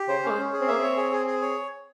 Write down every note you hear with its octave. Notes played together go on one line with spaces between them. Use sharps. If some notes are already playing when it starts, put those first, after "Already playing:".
Already playing: G4
C#3 C5
A#3 C#4
G#3
C#4
G#4
C4
A#3 E5
C4 C#5
G#4
G#4
G#4
C#5